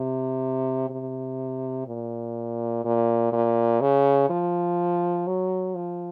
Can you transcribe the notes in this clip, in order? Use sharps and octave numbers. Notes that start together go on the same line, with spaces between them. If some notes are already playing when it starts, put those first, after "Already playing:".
Already playing: C3
C3
A#2
A#2
A#2
C#3
F3
F#3
F3